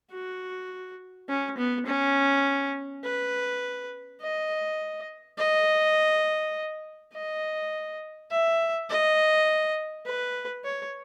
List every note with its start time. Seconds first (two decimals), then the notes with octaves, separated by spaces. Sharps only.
0.11 F#4
1.28 C#4
1.58 B3
1.86 C#4
3.04 B4
4.20 D#5
5.38 D#5
7.13 D#5
8.31 E5
8.89 D#5
10.06 B4
10.64 C#5